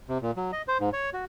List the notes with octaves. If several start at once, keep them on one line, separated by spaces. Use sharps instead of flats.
C3
A#2
F#3
D#5
C5
G#2
C#5
F#4